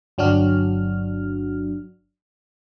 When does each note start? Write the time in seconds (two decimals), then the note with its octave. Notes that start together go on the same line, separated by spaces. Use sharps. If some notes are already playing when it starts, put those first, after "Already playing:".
0.18 G1 F#3 D4 F#4 F6